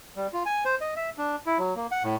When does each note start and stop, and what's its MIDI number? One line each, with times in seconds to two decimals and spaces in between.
0.16 0.27 55
0.33 0.43 65
0.46 0.64 80
0.65 0.75 72
0.81 0.94 75
0.96 1.10 76
1.18 1.36 62
1.46 1.58 64
1.58 1.74 54
1.76 1.87 58
1.91 2.03 78
2.04 2.16 45